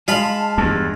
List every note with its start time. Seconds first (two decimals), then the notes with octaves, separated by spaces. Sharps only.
0.08 G#3 F4 F5 A5 B5
0.58 E2 G2